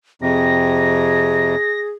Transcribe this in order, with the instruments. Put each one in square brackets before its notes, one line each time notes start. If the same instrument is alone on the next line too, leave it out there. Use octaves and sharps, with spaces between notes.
[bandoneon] F2 C3 [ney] G#4 [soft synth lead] A#6